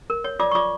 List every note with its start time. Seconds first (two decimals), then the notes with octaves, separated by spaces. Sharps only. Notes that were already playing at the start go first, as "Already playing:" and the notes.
0.10 A#4
0.24 C#5
0.39 F4 D5 D6
0.51 C#6
0.55 F4 D5 D6